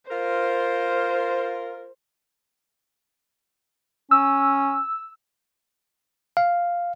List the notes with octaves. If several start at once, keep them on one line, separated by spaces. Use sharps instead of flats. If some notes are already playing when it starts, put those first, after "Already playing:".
F4 A#4 C5
C#4 E6
F5